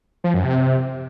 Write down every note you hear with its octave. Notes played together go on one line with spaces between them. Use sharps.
F3
F#2
C3